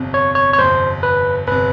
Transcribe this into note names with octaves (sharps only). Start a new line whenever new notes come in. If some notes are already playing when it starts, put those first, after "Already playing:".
Already playing: G1 F2 C3
C#5
C#5
C#5
G1 F2 C3 C5
B4
G1 C3 B4